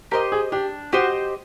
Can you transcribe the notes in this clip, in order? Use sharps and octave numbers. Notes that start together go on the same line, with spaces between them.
G4 A#4 C5 D#5
G#4
D4 G4
F#4 G4 C5 D#5